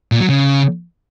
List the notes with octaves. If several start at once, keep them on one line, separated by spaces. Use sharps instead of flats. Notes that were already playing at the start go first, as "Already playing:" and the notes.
A#2
F#3
C#3